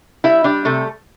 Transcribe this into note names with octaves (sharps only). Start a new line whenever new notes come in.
G3 E4 E5
G3 D4 D5
C3 A3 A4